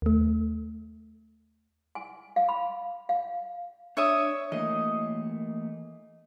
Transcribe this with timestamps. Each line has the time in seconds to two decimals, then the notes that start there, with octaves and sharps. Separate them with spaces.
0.02 D#2 A3
1.95 G#5
2.36 F5
2.49 B5
3.09 F5
3.97 D4 C#5 E5 D#6
4.52 E3 A3 A#3 D#5